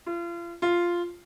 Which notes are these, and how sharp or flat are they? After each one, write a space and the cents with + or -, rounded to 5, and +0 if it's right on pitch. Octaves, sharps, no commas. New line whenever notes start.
F4 -35
F4 -5